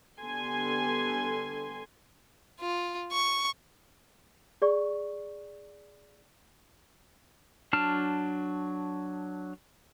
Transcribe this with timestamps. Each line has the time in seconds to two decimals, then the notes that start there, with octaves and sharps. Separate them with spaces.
0.19 D3 G3 B3 A4 G#5 C6
2.60 F4
3.12 C#6
4.62 G#4 D5 C#6
7.73 F#3 D4 A5 F6